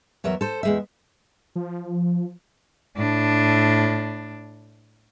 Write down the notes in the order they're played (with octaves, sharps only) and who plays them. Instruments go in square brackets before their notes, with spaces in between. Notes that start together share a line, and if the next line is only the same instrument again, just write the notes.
[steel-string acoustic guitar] E2 F#3 A#4 E5
A4 C5
E2 G#3 E5
[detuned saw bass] F3
[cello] A2 D4